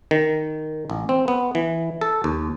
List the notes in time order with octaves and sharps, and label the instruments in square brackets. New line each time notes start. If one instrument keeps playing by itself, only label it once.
[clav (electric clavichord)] D#3
A1
C4
B3
E3
A4
D#2